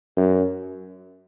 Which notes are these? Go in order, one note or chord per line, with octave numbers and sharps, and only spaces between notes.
F#2